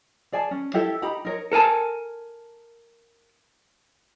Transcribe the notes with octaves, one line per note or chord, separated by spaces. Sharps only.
G#4 D5 G#5 A5
C#4
E4 G4 A4 E5
D#4 G4 A#5 B5
D#4 A#4 C#5
A4 A#4 G#5 A5